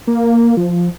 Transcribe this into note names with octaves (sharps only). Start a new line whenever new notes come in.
A#3
F3